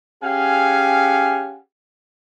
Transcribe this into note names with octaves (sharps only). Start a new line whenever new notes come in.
C#4 G4 G#4 F5 F#5 G#5